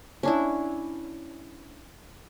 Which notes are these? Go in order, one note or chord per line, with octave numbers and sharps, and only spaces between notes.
C#4 D4 E4